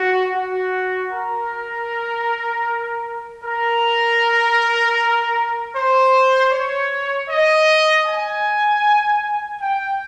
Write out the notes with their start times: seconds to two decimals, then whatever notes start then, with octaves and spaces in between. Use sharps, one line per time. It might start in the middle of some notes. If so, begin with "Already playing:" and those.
Already playing: F#4
0.34 F#4
1.11 A#4
3.44 A#4
5.75 C5
6.53 C#5
7.29 D#5
8.06 G#5
9.61 G5